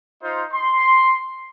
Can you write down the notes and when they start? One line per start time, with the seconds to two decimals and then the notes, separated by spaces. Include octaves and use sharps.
0.23 D#4 F4 C5
0.53 C6